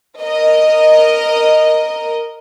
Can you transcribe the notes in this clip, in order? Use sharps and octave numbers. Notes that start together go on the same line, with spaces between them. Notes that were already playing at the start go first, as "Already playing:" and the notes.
A#4 D#5